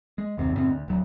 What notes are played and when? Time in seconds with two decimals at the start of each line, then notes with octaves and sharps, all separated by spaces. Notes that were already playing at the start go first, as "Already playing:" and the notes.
0.18 G#3
0.37 F#1 D#2 C3
0.53 F#2 A2 C#3 C4
0.70 D2
0.88 D1 F#3